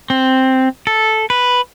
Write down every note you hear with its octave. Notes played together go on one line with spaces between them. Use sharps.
C4
A4
B4